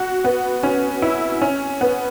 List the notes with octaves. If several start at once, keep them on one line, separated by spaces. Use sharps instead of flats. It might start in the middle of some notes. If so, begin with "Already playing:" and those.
Already playing: F#4
B3
C#4
E4
C#4
B3